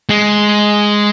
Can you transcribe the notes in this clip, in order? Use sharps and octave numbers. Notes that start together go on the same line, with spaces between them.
G#3